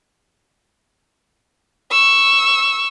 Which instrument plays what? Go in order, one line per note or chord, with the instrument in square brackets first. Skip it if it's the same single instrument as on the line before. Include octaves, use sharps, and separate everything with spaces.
[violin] C#6 E6